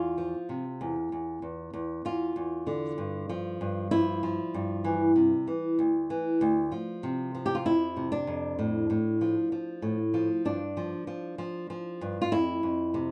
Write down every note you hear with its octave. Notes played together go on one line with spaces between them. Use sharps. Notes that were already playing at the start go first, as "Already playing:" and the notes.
Already playing: E2 F4
F3
C3
E2
E2
E2
E2
E2 F4
E2
D3
G2
F3
G2
F3 E4
F3
G2
E3
C3
E3
D2
E3
D2
F3
C3
F3
G4
F4
F2 E4
C3
D4
F2
A2
A2
F3
F3
A2
F3
G2 D4
F3
F3
F3
F3
G2
F4
F2 E4
F2
C3